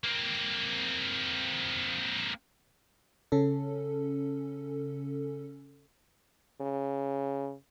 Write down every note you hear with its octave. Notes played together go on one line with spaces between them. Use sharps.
A#3 C4
C#3 C#4 A4
C#3